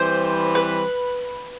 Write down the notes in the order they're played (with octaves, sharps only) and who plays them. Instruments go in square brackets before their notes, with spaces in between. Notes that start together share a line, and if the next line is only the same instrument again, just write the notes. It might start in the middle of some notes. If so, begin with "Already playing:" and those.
Already playing: [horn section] E3 G3 C4 [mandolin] C5
[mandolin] B4